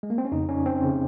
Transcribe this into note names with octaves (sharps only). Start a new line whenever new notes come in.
G#3
A#3
C4
C#4
F2 C#3 D#4
C#4
C4
C#3